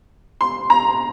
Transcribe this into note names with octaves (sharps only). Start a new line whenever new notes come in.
C6
A#5